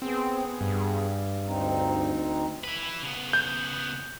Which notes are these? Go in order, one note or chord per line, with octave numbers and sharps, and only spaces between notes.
B3 C4 G#4
G2
D2 C4 D#4
E4 B4
C#3 B3
G6